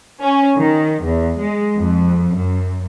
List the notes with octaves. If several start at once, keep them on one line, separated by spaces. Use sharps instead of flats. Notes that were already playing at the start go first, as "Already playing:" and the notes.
C#4
D#3
E2
G#3
F2
F#2